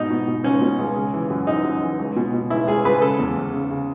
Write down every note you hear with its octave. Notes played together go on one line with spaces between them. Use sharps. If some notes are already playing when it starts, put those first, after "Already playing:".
Already playing: G#2 B2 D#4
B2
B2
C#2 C#4
B2
C#2
C#3
E3
F#2
E3 D#4
F#2
E3
C#2
B2
B2
C#2 E4
C#2 G#4
C#2 B4
C#3 A4
E2
E2
C#3
C#3